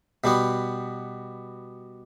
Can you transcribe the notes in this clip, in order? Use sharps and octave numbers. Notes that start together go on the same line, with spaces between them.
B2 G3 B3